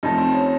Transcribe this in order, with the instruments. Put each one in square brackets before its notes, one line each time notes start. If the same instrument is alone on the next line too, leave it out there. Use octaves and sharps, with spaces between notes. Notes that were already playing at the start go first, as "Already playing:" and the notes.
[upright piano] F2 C3 F3 A3 D#4
C4
C#4